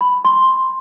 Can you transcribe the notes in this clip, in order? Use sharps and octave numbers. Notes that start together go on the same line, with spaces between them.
B5
C6